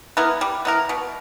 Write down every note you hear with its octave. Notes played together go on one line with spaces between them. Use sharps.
B3 E4 A#4
G3
B3 E4 A#4
B2